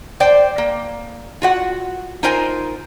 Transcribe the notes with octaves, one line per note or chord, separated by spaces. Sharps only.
C5 D5 G5
A#3
F4 F#4 F#5
D#4 F4 A#4 C5 G#5